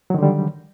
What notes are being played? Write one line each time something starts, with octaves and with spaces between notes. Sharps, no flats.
D3 D#3 F#3 G3